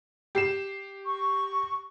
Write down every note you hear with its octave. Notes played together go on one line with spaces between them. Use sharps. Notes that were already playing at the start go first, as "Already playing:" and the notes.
G4 C7 E7
C#6